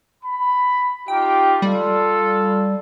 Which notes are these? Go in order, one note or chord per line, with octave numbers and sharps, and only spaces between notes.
B5
D#4 F4 G4 G5
G3 F4 A4